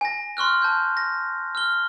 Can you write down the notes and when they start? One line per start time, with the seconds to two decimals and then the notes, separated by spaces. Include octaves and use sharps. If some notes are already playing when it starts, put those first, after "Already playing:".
0.01 G#5 A#6
0.37 C6 C#6 F6 F#6
0.62 A5 G6
0.97 A#6
1.55 F6 G7